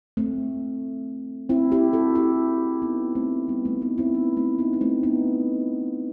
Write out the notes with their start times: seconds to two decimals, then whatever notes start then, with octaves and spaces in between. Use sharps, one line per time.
0.17 A3 C4
1.49 C4 E4
1.72 E4 G4
1.93 F#4 A4
2.15 E4 G4
2.82 B3 D#4
3.15 A3 C4
3.48 G3 B3
3.65 A3 C4
3.81 B3 D#4
3.98 C4 E4
4.14 B3 D#4
4.37 A3 C4
4.59 B3 D#4
4.73 D#4
4.81 A3 C4
5.03 B3 D#4